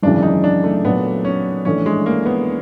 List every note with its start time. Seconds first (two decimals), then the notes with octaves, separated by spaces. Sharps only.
0.02 G#1 F#2 C#3 E3 D4
0.23 D#4
0.44 D4
0.64 A3
0.85 A#2 F#3 A3 B3
1.25 C#4
1.65 A#1 A2 E3 A3 C#4 D4
1.86 G#3
2.06 A#3
2.26 B3